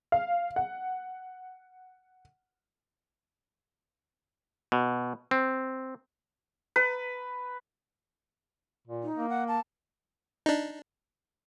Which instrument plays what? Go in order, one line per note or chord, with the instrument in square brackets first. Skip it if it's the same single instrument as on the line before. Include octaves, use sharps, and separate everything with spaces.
[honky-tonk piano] F5
F#5
[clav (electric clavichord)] B2
C4
[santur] B4
[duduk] A#2
[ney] D#4
[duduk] A#3
[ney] F#5
A5
[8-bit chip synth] D4 D#4